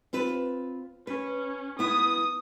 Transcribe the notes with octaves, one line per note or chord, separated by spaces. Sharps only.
C4 F4 B4
C#4 B4
B3 E4 D#6